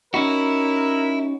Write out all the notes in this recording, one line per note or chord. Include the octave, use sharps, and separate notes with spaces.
C#4 D#4 F#4 A#4 E5 B5